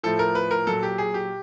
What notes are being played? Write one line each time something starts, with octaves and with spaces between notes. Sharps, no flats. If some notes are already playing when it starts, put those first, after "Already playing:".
A2 F3 A4
A#4
B4
A#4
A#2 F#3 A4
G4
G#4
G4